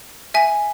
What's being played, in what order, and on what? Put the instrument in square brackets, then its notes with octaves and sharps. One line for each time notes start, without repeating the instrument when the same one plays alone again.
[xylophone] E5 G#5